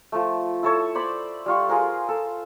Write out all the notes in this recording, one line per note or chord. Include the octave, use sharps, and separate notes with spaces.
F3 A3
E4 A4 C#5 A5
C5 D5 B5
G3 F4 C#6
F4 G#4 A#4 C5
A4